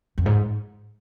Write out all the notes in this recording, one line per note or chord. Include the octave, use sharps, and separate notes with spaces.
F2
G#2